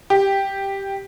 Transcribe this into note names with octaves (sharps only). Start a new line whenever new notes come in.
G4